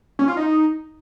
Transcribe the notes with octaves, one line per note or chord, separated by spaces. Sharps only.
C#4
F4
D#4